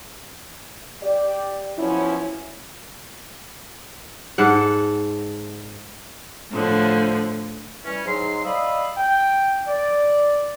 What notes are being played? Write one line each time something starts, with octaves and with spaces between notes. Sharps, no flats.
G4 D5
F3 F#3 B3 C#4 E4
G#2 A4 F#5
A2 D3 F3
E3 G3 C#4
G#2 F#3 C6
D5 D#5 F5 B5 D#6 E6
G5
D5